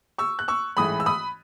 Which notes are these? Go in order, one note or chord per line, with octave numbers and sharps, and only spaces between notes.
C#6 E6
F#6
C#6 E6
A1 G#2 E3 A3 B5 D#6
E6
B5 D#6